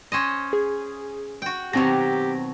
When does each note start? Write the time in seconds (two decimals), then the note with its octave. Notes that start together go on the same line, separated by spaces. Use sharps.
0.12 C#4 C5 D#5
0.53 G#4
1.42 F#4 G5
1.73 B2 D#3 F#3 C4 G4 A#6